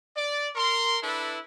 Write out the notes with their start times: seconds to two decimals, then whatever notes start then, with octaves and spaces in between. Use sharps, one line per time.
0.16 D5
0.56 A#4 C6
1.02 D4 E4 A4 B4